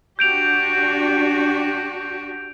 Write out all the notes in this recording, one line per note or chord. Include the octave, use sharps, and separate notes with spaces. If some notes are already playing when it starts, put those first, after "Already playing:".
D4 F#4 G4 G6 D7 F7